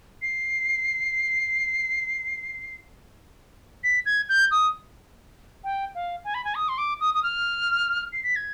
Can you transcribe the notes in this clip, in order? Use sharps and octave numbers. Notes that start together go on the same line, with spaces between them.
C7
B6
G#6
G6
D#6
G5
F5
G#5
B5
G#5
D#6
C6
D6
D#6
D#6
F6
C7
B6
G#6